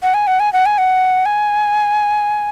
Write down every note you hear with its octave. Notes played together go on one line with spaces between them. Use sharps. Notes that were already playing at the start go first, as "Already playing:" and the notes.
F#5
G#5
F#5
G#5
F#5
G#5
F#5
G#5